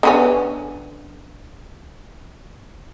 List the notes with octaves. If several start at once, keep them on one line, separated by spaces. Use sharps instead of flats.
D3 B3 C#4